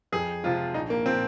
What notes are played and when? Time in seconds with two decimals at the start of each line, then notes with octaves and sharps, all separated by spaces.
0.12 F2 G#4
0.44 C3 F3 G#3 F4
0.74 A#1 D#4
0.90 A#3
1.06 F3 C4
1.09 A#2